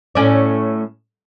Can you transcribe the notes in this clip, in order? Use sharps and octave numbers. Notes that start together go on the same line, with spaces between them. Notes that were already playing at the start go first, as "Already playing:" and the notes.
A2 C#4 D5